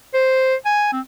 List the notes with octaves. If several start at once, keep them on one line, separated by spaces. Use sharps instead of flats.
C5
G#5
C4